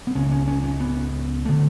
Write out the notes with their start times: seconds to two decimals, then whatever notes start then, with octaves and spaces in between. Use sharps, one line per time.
0.07 B3
0.15 C#2 C#3 C#4
0.31 C#4
0.48 C#4
0.64 C#4
0.80 B3
1.45 D3 A3